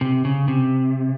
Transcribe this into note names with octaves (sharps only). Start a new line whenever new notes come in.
C3
C#3
C3